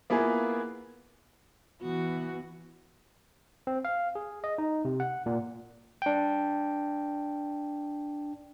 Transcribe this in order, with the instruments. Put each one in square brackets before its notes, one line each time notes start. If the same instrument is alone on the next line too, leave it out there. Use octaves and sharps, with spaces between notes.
[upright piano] A#3 B3 E4 F4 G#4
[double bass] E3 B3 [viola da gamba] F#4
[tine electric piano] C4
F5
G#4
D#5
D#4
C3
F#5
A#2
D4 G5